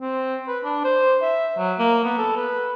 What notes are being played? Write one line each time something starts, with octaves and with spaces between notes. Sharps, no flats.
C4
B4
D4
C5
E5
F#3
A#3
B3
A4
B4